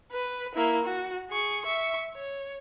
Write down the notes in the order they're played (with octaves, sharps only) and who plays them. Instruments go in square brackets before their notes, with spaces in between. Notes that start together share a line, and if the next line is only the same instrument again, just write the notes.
[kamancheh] B4
A#3 E4
F#4
G#4 C#6
E5 C#6
C#5